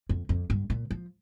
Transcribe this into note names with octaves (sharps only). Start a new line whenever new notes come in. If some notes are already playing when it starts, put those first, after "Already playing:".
F2
F2
G2
A#2
F3